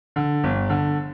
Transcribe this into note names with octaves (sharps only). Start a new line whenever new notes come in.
D3
G1
D3